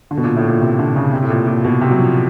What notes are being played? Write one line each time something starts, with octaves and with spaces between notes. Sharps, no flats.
D3
B2
A#2
A2
A#2
C3
D3
C#3
C3
A2
A#2
A#2
B2
C3
F#3
F3